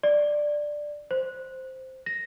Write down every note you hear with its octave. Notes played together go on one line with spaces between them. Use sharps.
D5
C5
A#6